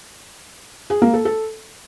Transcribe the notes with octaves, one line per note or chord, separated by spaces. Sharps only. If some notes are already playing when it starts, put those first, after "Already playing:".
G#4
A#3
A4
A4